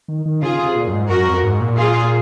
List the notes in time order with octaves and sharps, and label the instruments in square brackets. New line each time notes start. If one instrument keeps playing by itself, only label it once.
[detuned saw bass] D#3
D#3
[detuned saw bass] C#3 [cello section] F4 G#4
[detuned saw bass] C3
A#2
F#2
G#2
[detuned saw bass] F#2 [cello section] F#4 A#4
[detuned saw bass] F2
G#2
A#2
[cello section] F4 G#4